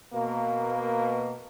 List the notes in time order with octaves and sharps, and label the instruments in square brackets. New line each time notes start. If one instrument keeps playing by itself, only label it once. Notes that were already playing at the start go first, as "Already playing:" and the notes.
[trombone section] B2 A#3